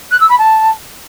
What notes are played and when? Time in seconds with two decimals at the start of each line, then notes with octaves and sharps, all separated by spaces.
0.11 F#6
0.20 E6
0.29 B5
0.38 A5